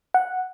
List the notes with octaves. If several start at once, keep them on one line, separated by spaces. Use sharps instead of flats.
F#5